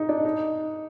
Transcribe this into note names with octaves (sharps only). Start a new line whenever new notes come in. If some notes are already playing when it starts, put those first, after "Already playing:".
Already playing: D#4
D4
D#4